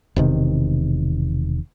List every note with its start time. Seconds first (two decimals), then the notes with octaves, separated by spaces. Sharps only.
0.16 E1 C3 D#3